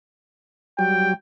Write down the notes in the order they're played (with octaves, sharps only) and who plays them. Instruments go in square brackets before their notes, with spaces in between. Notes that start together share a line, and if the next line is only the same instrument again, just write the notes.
[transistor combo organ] F#3 G3 [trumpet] G5